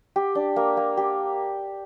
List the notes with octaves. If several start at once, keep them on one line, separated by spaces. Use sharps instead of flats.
G4
D4
A#3
A#3
G4